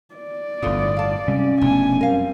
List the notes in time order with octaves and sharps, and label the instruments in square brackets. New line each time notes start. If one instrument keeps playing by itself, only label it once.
[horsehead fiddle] D5
[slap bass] G1 A2 [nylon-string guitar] E2 D3 F4 [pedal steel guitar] D#6
[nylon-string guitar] F5 A5
[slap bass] C3 G3 G#3 [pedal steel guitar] C#4
[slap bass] F1 B2 A3 [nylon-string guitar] D4 [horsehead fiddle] G#5
[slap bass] F#2 [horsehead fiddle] G3 C4 [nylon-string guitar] A#4 F5